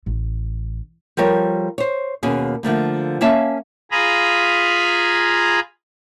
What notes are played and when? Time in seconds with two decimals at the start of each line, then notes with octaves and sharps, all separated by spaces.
0.06 A1
1.17 F3 G3 A4 A#4 C#5
1.78 C5 C#5
2.23 D#2 B2 A#3 C#4 G#4
2.63 D3 F3 A3 A#3
3.21 A#3 C#4 C#5 E5 F5 A5
3.91 F4 G#4 G#5 A#5 B5